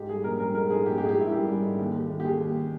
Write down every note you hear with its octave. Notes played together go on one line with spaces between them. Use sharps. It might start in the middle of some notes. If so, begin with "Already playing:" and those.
Already playing: G#2 G4
G3 G#4
A#1 A#4
G3 A#4
G#2 A#4
G#2 G#4
A#1 G4
G4
G#2 G#4
G4
G#2 E4
G3 G4
G3
G#2
D#2
D#2
D#2
G4
D#2 G#4
D#2